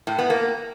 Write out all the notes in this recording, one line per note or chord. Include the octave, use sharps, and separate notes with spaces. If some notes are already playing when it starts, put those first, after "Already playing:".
A2
B3
A#3